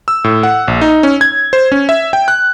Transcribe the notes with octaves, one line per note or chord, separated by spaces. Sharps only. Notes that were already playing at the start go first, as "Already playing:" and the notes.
E6
A2
F#5
A#1
D#4
C#4
G#6
C5
C#4
E5
G5
F#6